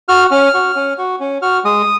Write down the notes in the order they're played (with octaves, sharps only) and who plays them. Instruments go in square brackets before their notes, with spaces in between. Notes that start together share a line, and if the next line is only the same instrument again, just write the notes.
[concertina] F#4 F6
C#4 F6
F#4
C#4
F#4
C#4
F#4 F6
G#3 D#6